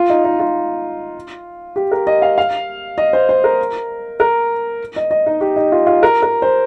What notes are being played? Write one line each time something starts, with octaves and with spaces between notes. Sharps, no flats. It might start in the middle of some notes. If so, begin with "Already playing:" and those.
Already playing: F4
D#4
D#4
F4
G4
A#4
D#5
F5
F5
D#5
C5
C5
A#4
A#4
D#5
D#5
D#4
G4
D#4
F4
F4
A#4
A#4
C5